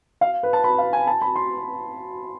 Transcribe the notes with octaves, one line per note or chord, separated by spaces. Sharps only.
F5
B4
A5
B5
F5
G#5
A5
B5
C6